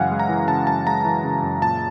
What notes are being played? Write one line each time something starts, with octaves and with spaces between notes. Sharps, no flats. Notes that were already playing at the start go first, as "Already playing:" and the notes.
Already playing: F#2 C#3 E3 G#3 F5 F#5 G#5
G#3
A#5
E3
C#3 A5
F#2 A5
G#3 A#5
E3
C#3
F#2
A#2 A5